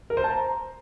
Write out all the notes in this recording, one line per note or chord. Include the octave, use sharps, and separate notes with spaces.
A#4
C5
A5
A#5